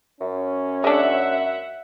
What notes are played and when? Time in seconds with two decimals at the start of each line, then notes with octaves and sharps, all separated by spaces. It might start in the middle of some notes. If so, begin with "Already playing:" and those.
0.21 F#2 C#4
0.84 G#3 D4 E5 F#5